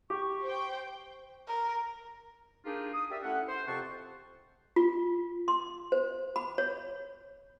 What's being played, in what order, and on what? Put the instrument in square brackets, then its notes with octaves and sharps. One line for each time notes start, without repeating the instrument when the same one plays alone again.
[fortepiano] G4 [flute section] C#6
[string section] C5 G5
[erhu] A#4
[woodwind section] A#3 D4 D#4 F4 G4 G#4
D#6
G4 A#4 D5 E5
A3 C#4 E4 F#5
C5
F2 C3 C4 F#5 A5 C#6
[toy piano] F4
C6
C5
B5
C#5